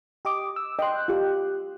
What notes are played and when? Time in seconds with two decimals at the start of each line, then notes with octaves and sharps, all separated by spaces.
0.25 G4 D#5 D6
0.56 E6
0.79 D#5 G5 C6 F#6
1.08 F4 G4